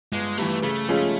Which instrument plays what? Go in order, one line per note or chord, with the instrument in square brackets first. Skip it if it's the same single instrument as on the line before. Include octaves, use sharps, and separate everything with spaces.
[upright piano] G1 [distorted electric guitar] G#3
[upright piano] G2 E3 [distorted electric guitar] A3
[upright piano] C#3 [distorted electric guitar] A3
[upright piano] F3 G#3 C#4 F4